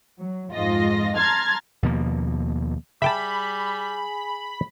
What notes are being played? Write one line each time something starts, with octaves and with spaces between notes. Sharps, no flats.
F#3
F2 G#2 F4 D#5 A#6
A5 A#5 C6 F6 G#6 A6
D#2 B2 F3 A#3
G3 G#4 E5 G5 A5 B5